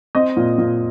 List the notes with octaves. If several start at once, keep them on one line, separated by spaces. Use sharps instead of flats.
C4 D#5
A#2
A#2